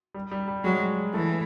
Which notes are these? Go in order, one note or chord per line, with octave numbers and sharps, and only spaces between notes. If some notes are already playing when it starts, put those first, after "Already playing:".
G3
G3
G3
F#3 G#3
E3 A3